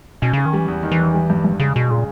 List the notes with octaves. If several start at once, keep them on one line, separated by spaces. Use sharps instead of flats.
B2 C#4
C#3 C#4
D#3
E3 G3
E2
D#3
E3
E2
G3
G2
G2
C#3 G#3
B2 G#3
A#2 C#3